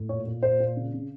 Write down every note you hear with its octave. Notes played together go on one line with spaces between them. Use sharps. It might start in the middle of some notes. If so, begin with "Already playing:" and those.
Already playing: A2
A#2 C#5
A#2
A#2 C5
A#2
C#3
C#3